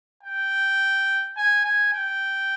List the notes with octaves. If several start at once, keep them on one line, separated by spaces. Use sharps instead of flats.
G5
G#5
G#5
G5